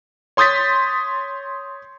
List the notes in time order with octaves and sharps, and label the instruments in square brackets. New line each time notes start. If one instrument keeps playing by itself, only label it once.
[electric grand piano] C#5 C6 D#6 G6 A6 B6